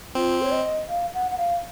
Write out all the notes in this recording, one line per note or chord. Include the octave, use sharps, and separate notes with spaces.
C4 F4
C#5
D#5
F5
F#5
F#5
F5